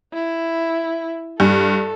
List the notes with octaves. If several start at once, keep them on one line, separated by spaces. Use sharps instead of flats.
E4
G2 A4